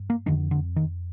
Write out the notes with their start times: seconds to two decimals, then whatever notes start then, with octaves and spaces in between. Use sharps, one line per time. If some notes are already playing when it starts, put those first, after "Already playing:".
Already playing: G2
0.10 A#3
0.26 F2 D3 D#3
0.51 D3
0.76 D#3